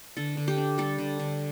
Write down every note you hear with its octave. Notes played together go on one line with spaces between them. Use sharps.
D3 A4
D3
G4
D4
G3 A4
D3
D3